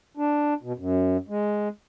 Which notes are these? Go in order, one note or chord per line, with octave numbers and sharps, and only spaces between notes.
D4
B2
F#2
G#3